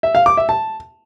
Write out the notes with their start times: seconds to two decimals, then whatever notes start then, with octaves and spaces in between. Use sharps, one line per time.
0.03 E5
0.15 F5
0.26 D6
0.37 E5
0.49 A5